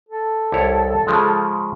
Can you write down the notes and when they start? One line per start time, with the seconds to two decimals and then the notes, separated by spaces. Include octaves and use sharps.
0.09 A4
0.52 C2 E4 C#5
1.07 C#3 F3 G#3